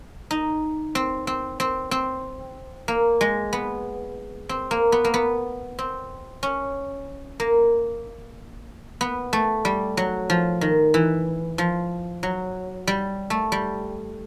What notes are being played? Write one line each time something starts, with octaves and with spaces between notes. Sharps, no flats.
D#4
C4
C4
C4
C4
A#3
G#3
B3
C4
A#3
B3
A#3
B3
C4
C#4
A#3
B3
A3
G3
F#3
F3
D#3
E3
F3
F#3
G3
A3
G3